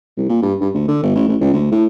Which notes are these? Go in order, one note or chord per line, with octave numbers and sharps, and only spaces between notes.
C2
A#2
G2
G2
D2
D3
G1
A1
A1
C#2
D2
A2